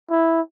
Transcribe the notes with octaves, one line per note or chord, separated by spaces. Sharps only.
E4